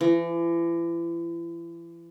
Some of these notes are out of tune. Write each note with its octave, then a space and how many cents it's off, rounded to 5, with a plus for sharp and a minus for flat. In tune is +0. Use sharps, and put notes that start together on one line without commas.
E3 +40